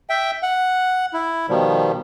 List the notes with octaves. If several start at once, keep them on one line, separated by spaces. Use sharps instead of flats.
E5 G5
F#5
E4
B2 D#3 F3 G3